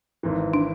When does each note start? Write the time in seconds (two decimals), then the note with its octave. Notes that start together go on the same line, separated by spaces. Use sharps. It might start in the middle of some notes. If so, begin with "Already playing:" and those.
0.23 G#1 G#2 E3
0.54 D4